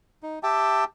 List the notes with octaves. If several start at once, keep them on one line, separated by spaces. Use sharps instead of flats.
D#4
G4 E5 G5 A5